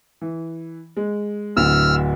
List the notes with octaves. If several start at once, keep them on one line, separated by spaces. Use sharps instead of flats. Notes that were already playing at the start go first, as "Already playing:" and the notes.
E3
G#3
D1 D2 E6 F6